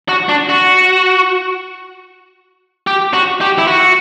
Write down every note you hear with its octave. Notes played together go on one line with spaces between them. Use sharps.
F#4
D4
F#4
G4
F#4
G4
E4
F#4